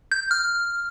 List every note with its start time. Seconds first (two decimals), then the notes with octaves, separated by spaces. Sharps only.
0.12 G6
0.31 F6